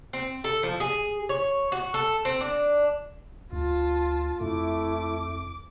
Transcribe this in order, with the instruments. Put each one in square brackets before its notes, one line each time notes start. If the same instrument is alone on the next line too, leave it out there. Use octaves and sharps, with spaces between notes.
[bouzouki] C4
A4
F3
G#4
C#5
F#4
A4
C4
D4
[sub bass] D2 [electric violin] F4 A5
[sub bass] F2 [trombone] A3 [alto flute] E4 [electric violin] D6